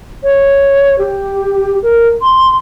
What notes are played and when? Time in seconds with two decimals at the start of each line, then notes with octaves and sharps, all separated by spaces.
0.23 C#5
0.99 G4
1.83 A#4
2.21 C6